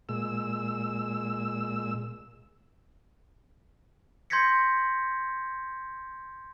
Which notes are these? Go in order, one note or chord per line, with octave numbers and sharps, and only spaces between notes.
A#2 G#3 E6
C6 G6 G#6 A#6 B6 C#7